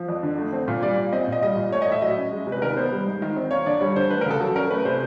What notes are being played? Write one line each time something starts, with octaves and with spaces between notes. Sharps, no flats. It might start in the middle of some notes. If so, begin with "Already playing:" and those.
Already playing: F3
F2
D3
A3
C4
A#2
G3 D5
A#2
C4 D#5
A#2 D#5
G3 D#5
A#2
A3 C#5
D#5
A2 E5
F#3 D#5
C#4
G#3
C3
B4
D#3 A#4
B3 C5
G3
G#2
D#3
C4
A#3 C#5
D3 D5
G3 C#5
D3 C5
A3 B4
A#4
C#3 A4
F#3 A4
C#4 A#4
A3 B4
C3 C5